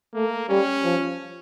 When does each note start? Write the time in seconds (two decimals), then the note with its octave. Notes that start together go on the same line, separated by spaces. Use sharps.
0.14 A3 A#3
0.49 G3 C#4
0.84 F3